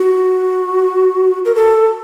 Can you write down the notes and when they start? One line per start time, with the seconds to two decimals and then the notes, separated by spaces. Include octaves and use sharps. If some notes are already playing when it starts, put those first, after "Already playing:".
Already playing: F#4
1.45 A#4
1.55 A4